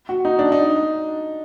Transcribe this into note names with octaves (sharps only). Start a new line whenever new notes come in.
F#4
D#4
D4
D#4